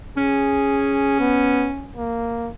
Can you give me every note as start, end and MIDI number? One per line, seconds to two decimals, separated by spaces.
0.17 1.93 61
0.17 1.15 68
1.19 1.70 59
1.97 2.50 58